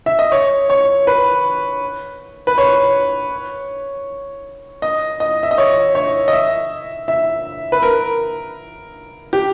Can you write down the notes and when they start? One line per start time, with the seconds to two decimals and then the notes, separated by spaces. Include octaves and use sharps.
0.06 E5
0.19 D#5
0.32 C#5
0.70 C#5
1.07 B4
2.47 B4
2.58 C#5
4.82 D#5
5.20 D#5
5.43 E5
5.51 D#5
5.58 C#5
5.95 C#5
6.28 D#5
6.33 E5
7.08 E5
7.72 B4
7.82 A#4
9.33 G4